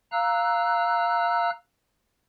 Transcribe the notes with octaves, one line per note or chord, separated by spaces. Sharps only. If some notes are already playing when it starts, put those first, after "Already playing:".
F5 A#5 E6 F#6